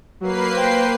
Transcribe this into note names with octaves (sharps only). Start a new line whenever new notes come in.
F#3 A#3 B4 C7
C5 G5